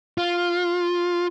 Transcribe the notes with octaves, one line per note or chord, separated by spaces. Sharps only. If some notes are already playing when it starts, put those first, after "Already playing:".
F4